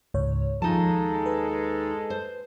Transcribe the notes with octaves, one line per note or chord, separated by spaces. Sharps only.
C#2 G#2 C#5
D#2 F3 G#3 D#4 A4 A5
B4
C5